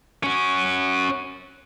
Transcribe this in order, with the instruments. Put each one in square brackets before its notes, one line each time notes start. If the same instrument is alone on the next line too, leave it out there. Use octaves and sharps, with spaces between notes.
[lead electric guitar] C#4 F#4